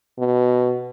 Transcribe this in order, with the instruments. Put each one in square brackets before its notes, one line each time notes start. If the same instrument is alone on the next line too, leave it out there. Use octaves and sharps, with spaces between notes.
[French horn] B2